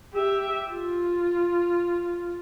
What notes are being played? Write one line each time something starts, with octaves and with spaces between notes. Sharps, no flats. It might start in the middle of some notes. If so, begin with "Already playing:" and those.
G4 E5
F4